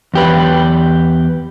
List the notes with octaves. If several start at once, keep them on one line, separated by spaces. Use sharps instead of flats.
E2 G4 B4